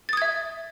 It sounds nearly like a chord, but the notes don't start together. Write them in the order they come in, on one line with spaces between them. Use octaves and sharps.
A6 D#6 G#6 E5